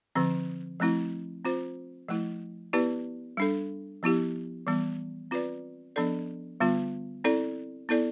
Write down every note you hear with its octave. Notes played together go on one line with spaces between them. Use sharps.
D3 F3 C4
F3 A3 C4 E4
C4 F4 C5
F3 A3 E4
B3 E4 G4 B4 D5
G3 D4 A4
F3 B3 E4 G4
E3 G3 B3
C4 F4 B4 D5
F3 B3 D4 A4 D5
D3 G3 B3 F4
C4 E4 A4 D5
B3 E4 A4 D5